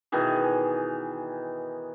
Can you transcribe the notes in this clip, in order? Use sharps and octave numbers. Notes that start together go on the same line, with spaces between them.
B2 D#3 E3 G#4